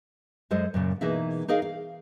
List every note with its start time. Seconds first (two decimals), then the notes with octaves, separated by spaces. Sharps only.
0.51 F#2 G#3 A4 C5 D#5
0.74 F#2 A#2 C#3
1.01 B2 E3 A#3 D#4 G#4 E5
1.48 D#4 G#4 A#4 D#5 F5
1.62 F5